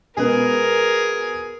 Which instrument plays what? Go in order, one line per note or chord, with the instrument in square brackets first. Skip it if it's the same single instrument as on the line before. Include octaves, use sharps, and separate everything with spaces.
[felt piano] B2 G#3 B3 [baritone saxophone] G#4 [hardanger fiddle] A#4